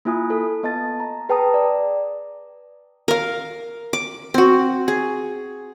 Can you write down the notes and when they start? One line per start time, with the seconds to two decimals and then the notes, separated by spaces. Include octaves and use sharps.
0.05 A#3 E4 F4 G#5 D#6
0.30 A4
0.63 B3 D#5 A5 A6
1.00 A#5
1.29 G#4 B4 G5 A5 A#5 D#6
1.54 D5
3.08 A#4 F5
3.93 D6
4.34 C4 F#4
4.88 G#4